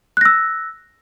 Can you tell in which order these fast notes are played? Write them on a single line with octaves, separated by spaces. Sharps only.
F#6 A#6 E6